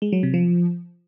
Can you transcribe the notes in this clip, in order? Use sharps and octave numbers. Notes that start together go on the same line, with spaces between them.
G#3
F#3
C3
F3